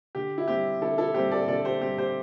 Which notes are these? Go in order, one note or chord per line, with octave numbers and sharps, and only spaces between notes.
D3 G4
E4
G3 C4 G4
D3 E4 A4
E4 A4
G3 C4 G4 C5
A4 D5
D3 A4 D5
G4 C5
G3 C4 G4
G4 C5